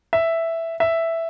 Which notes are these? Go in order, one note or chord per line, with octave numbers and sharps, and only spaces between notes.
E5
E5